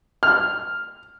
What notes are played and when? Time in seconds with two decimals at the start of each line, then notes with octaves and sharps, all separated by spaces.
0.23 F6